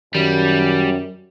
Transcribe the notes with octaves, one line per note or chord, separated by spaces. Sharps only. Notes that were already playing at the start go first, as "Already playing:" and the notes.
F#2 D#3 G3